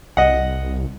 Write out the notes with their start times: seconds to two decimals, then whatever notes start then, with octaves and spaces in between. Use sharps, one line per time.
0.17 C2 D#5 F#5